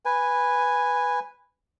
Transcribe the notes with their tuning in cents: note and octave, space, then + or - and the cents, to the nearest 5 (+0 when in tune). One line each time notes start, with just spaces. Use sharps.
B4 +0 G#5 -10